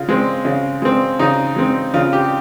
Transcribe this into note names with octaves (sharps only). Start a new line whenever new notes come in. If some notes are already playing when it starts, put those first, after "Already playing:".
Already playing: C#3 F4
G#3 C4
C#3
G#3 C4
C#3 D#4
G#3 C4
C#3 F4
G4